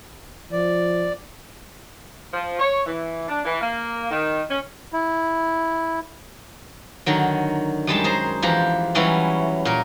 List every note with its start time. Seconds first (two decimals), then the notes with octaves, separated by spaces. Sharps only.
0.52 F3 D5
2.32 F3
2.59 C#5
2.85 E3
3.28 D4
3.44 E3
3.60 A#3
4.10 D#3
4.49 C#4
4.93 E4
7.06 D3 D#3 F#3
7.87 F#2 G3 G#3 A5
8.04 G#4 C5 A#5
8.42 E2 F3 G4 A#5
8.95 E3 F#3 G3 C#4 E4
9.65 A#2 A#4